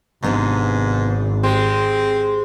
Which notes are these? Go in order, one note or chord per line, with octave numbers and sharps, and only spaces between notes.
G#1 G#2 C3 B3 D4
G#3 C4 G4